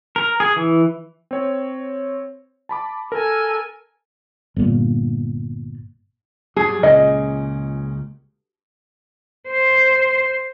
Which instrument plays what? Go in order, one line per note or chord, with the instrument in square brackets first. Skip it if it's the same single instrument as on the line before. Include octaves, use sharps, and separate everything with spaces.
[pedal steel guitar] A#4
G#4
E3
[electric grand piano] C4 C#5
A5 B5 D6
[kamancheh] A4 G#5 [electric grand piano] A#4
[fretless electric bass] G1 A#2
[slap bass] G2 F#3 [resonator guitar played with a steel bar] G#4
[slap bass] C#2 A#2 C#3 [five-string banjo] D#5
[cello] C5